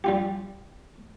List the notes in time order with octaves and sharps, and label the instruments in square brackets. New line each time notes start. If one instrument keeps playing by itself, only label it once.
[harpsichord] G3 F4 G4